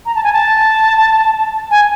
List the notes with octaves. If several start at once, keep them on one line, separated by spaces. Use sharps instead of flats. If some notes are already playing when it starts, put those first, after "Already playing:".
A#5
A5
G#5
A5
G#5